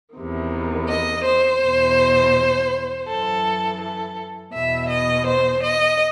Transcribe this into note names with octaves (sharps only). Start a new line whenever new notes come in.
E2 C3 D#3
D#5
C5
E2 B2
F#2 E3 A4
A4
E2 B2 E5
D#5
C5
D#5